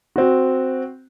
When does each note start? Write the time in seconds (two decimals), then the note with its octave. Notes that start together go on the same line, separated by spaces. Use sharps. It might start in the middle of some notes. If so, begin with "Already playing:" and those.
0.16 C4 F#4